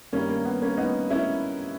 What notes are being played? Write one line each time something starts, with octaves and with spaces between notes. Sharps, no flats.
G2 D#3 G3 A#3 C#4
A#3
B3
A#3 C#4
B3 D#4
C#4 E4